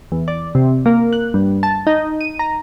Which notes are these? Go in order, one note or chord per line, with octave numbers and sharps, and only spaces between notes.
E2
D5
C3
A#3
F#6
G2
A5
D#4
D#7
A#5